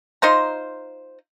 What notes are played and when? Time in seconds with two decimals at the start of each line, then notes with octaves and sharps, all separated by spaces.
0.22 D#4 F4 C5 A#5